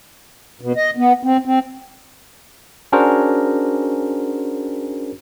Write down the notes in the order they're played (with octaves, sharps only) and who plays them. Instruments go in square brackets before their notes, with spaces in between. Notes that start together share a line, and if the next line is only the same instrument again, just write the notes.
[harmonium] B2
D#5
B3
C4
C4
[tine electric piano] C#4 D4 F#4 G#4 A#4 C5